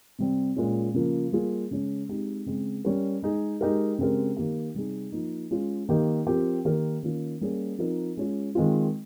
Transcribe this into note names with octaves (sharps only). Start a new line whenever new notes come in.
C3 G3 C4
A#2 G#3 C#4
C#3 F3 A#3
G3 A#3 F4 G#4
C#3 G#3 C#4
G#3 C4 D#4 G4
C#3 G#3 C4
G3 C#4 G4 A#4
G#3 D#4 G#4
G#3 D#4 G4 A#4
C#3 G#3 C4 G4 A#4
D#3 A#3 D#4 G4
C3 G3 C4 D#4 G#4
F3 A#3 D#4
G#3 C#4 F4 G#4
D#3 A#3 D#4 G4
F3 C4 G4 A#4
D#3 A#3 D#4 G4 A#4
D#3 A#3 C#4 F4
G3 A#3 C#4 G#4
F3 C4 D#4 A#4
G#3 C#4 F4
D#3 G#3 C4 F4